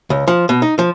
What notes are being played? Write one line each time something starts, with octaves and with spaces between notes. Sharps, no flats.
C#2
F3
B2
D#4
F3